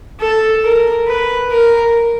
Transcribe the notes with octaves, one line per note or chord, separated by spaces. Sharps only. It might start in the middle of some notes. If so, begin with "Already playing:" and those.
A4
A#4
B4
A#4